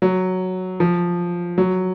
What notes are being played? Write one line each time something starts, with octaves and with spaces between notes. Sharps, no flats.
F#3
F3
F#3